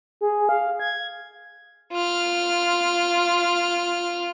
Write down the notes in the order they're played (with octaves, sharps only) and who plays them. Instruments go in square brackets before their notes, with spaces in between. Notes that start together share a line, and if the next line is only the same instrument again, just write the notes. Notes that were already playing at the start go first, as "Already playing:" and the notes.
[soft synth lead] G#4
F5
G#6
[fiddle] F4 F6